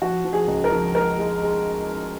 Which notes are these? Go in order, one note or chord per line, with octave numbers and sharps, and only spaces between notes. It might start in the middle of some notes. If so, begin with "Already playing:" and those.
F3 F#4
F3
G#4
C#2
A#4
F3
G#3 A#4
G#3
G#3